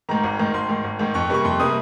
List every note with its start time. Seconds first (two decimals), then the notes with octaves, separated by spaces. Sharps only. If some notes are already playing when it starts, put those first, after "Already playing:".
0.09 G#2 D#3 A#5
0.24 G#1
0.39 G#2 D#3
0.53 G#1 C6
0.69 G#2 D#3
0.84 G#1
0.99 G#2 D#3
1.14 F2 C#6
1.30 C3 G3 A#3 C#6
1.44 F2 C6
1.59 C3 G3 A#3 D#6